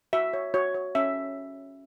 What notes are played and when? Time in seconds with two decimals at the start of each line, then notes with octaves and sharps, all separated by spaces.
0.13 F#4 E5
0.34 C#5
0.54 F#4 C#5
0.75 C#5
0.95 C#4 E5